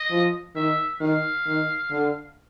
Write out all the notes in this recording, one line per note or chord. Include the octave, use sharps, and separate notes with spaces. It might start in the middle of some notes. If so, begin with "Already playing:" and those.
Already playing: D#5
F3
D#3 E5
D#3 F5
D#3
D3